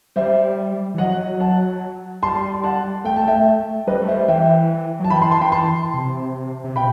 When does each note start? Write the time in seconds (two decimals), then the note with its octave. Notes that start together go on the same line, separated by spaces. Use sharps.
0.16 G3 C5 E5
0.94 E3
0.98 F#3 D#5 F#5
1.40 F#5 A5
2.22 G3 A5 C6
2.64 F#5 A5
3.04 A3 G5
3.16 A5
3.27 E5 G5
3.87 G3 B4 D#5
4.02 A3
4.08 C5 E5
4.14 G3
4.28 E3 E5 G5
5.00 F#3 A5
5.10 E3 G5 B5
5.21 A5 C6
5.31 A5 C6
5.41 G5 B5
5.52 A5 C6
5.94 C3
6.64 C3
6.76 B2 G5 B5